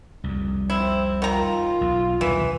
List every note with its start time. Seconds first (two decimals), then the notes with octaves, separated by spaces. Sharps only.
0.24 C2 F2
0.70 C4 E4
1.22 D#3 F4 A#5
1.81 B1
2.21 D#1 B1 C3 E3